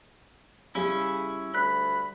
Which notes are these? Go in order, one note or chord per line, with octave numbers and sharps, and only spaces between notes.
C#3 G3 C#4 E4 G#4
D2 B5 F#6